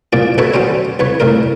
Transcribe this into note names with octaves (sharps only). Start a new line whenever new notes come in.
C2 A#2 D5
B2 A4 B4 C#5
F#3 G3 C#4 C5
C2 B4 C#5
C2 A2 A#4